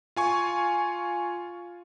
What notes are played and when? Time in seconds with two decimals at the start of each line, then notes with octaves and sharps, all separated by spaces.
0.16 F4 G#5 C#6